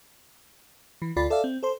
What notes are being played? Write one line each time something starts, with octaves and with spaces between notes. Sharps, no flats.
E3
D2 F4 D5 B5 A6
A4 D5 E5 F5
C4
A4 C5 C6